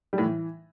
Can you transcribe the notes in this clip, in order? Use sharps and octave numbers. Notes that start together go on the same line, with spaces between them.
G3
A2
E3